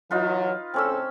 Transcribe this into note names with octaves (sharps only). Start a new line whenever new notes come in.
E3 F#3 D#4 F4 B4
A2 C#3 C4 C#4 A4 E6